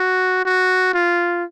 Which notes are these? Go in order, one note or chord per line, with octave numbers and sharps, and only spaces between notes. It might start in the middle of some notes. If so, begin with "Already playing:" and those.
Already playing: F#4
F#4
F4